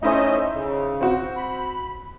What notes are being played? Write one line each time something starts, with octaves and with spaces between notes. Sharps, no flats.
A3 C#4 D#4 E4 C5 D#5
C#3
C4 F#4
B5